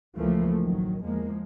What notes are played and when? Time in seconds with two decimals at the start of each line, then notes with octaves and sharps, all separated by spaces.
0.17 C#2 E3 F3 A3 A#3
0.60 A1 D#3 F#3
1.04 E2 F3 G#3 A#3